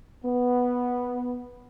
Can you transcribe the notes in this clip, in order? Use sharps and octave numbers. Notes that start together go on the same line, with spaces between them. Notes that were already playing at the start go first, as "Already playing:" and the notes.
B3